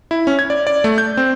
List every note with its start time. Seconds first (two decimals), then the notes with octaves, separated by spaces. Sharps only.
0.11 E4
0.27 C#4
0.39 G#6
0.50 D5
0.67 D5
0.84 A3
0.98 G6
1.17 C4